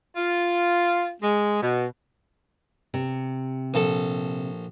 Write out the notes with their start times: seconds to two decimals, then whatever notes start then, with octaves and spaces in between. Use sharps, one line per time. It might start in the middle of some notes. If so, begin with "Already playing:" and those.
0.17 F4
1.22 G#3
1.61 B2
2.94 C3
3.74 A#1 A4